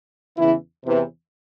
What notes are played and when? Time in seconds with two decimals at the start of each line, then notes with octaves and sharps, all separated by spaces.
0.38 E2 C#3 E3 E4
0.86 E2 C3 E3